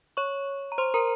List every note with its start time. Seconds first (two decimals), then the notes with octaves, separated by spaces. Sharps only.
0.17 C#5 C#6
0.72 A#5
0.78 C5 C6
0.94 A#4 A#5